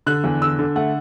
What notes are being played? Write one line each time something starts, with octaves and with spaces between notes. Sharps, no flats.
D3 F#6
E2
D3 E6
D3
A3 F#5